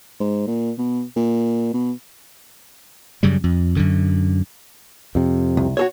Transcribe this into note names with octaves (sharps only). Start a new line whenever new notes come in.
G#2
A#2
B2
A#2
B2
F#2 C#3 G3
F2
F#2 D3
F2 C3
C2
F#4 A4 C#5